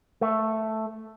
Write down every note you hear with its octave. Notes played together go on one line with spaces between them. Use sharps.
A3